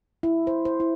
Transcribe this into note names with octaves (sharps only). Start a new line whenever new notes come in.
E4
C5
C5
E4